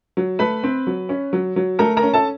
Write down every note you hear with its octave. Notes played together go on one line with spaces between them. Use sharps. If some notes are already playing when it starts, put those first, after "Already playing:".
F#3
A3 B4 B5
C4
F#3
C#4
F#3
F#3
A3 A#4 A#5
A#4 A#5
C#4
A4 A5